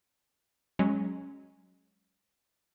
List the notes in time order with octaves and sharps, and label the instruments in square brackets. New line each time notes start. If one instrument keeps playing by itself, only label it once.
[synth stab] F#3 G#3 C#4